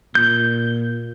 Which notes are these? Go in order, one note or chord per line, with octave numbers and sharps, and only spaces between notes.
A#2 G6